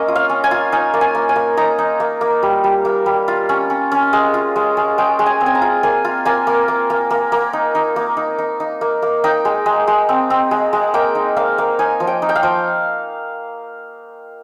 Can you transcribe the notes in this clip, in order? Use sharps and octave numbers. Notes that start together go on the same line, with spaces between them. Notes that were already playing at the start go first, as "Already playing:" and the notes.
Already playing: A#3 C#4 C#5 D#5
F4
F5
C#4
G#5
F4
D#4 G#5
A#3
G#5
A#3
G#5
A#3
D#4 A#5
D#4
A#3
A#3
G3
G3
A#3
G3
F4
C#4
C#4
C#4
G#3
F4
G#3
G#3
G#3 G5
G#3
G#5
C4
G#5
A#5
F4
A#3 G#5
F4
A#3 G#5
A#3
A#3
A#3
A#3
A#3
D#4
D#4
A#3
D#4
D#4
D#4
A#3
A#3
D#4 G5
G#3
G#3
G#3
C4
C4
G#3
G#3
A#3 G5
D#4
A#3 F5
A#3
D#4 G#5
F3
G5
D#4
G5
F5
F3